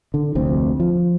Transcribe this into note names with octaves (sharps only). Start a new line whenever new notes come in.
D3
F1 D2 C4
F3